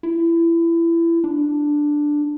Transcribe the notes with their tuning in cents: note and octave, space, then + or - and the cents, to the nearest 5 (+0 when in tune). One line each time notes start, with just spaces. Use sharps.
E4 +25
D4 +5